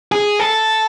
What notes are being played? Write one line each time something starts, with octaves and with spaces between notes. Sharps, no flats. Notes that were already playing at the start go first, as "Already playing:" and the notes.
G#4
A4